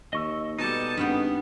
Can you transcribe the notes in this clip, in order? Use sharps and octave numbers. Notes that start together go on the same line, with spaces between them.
D#2 D#5 C#6 E6
B2 G3 D#4 A4 A5
G#1 G2 B3 F#5 G5